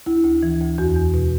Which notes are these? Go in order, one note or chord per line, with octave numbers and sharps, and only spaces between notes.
D2 E4
D2
E3
D2
E2 F#4
E2
B2